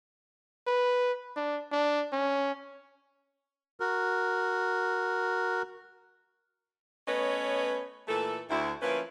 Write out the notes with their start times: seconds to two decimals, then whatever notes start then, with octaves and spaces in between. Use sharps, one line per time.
0.67 B4
1.36 D4
1.72 D4
2.13 C#4
3.80 F#4 A#4
7.08 A3 B3 C#4 B4 C#5 D#5
8.08 A#2 E3 A3 A4
8.50 D2 E4
8.82 F3 A#3 C#4 E4 B4